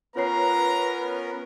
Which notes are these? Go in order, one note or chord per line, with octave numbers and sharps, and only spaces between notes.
B3 C#4 F4 A#4 B4 C#5 A#5 C7